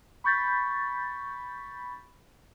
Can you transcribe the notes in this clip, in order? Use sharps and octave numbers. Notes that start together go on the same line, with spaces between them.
B5 C#6 G6 A6 B6